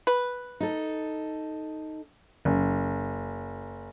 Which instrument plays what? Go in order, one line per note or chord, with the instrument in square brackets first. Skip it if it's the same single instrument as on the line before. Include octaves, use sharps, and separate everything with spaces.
[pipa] B4
[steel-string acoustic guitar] D#4 A4
[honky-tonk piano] F#1